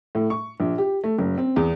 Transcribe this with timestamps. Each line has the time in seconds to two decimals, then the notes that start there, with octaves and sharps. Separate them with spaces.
0.15 A2
0.30 C#6
0.60 A#1
0.78 G4
1.04 A3
1.18 F#1
1.38 C4
1.56 E2